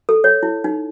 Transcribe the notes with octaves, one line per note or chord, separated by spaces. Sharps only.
A4
C#5
E4
D#4